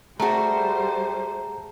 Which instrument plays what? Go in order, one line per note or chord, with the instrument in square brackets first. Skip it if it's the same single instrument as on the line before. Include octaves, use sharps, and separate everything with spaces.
[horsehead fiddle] G3 C5 [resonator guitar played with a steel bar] A3 F#4 [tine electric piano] G#4 A5 A#5